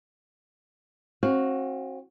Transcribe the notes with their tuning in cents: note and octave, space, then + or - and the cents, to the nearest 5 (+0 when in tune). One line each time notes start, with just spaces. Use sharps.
C4 +40 F#4 +0 F5 +0